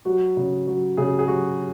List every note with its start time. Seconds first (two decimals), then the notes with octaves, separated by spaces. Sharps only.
0.05 F#3 F#4
0.37 C#3
0.67 F#3
0.97 C#3 G#4
1.19 G#4
1.28 F#3 F#4